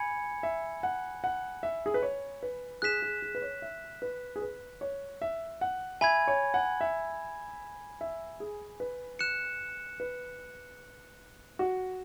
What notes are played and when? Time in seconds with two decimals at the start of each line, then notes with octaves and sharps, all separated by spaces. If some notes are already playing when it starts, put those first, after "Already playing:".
Already playing: G#5 B5 G#6 C#7
0.43 E5
0.83 F#5
1.24 F#5
1.63 E5
1.86 G#4
1.94 B4
2.03 C#5
2.43 B4
2.82 G#4 F#6 B6 E7
3.02 G#4
3.22 G#4
3.35 B4
3.42 C#5
3.62 E5
4.02 B4
4.36 G#4
4.42 B4
4.81 C#5
5.22 E5
5.61 F#5
6.01 E5 G#5 B5 G#6
6.28 C#5
6.54 F#5
6.81 E5
8.01 E5
8.40 G#4
8.80 B4
9.19 F#6 C#7 E7
10.00 B4
11.59 F#4